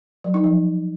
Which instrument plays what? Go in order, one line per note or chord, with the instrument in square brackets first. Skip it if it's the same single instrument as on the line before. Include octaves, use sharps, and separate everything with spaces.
[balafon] F#3
D#4
F3